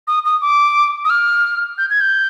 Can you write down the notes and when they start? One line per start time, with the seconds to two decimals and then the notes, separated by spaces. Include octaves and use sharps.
0.07 D#6
0.26 D#6
0.42 D6
1.05 D#6
1.10 F6
1.78 G6
1.90 G#6
2.01 G6